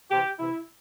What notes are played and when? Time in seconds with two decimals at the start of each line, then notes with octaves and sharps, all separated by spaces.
0.10 C3 E3 G4
0.39 C3 E3 E4